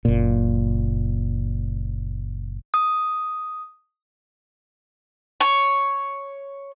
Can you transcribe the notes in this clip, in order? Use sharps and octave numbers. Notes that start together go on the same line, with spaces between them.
F#1 A#2
D#6
C#5